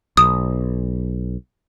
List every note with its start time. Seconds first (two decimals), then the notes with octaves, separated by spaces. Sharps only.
0.17 B1 D#6